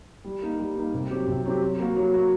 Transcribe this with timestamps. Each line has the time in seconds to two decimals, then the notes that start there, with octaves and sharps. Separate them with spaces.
0.25 G3
0.42 A#3 D#4
0.59 G3
0.76 A#3 D#4
0.94 C3
1.11 F#3 C4 G4
1.28 C3
1.45 F#3 C4 G4
1.62 F#3
1.80 A#3 F#4
1.97 F#3
2.14 A#3 F#4